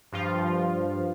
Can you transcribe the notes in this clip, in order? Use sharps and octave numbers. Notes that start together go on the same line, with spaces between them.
G2 F3 F4